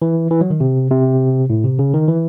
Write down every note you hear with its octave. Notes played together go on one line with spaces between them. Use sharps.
E3
E3
F#3
D#3
C3
C3
A2
C3
C#3
D#3
E3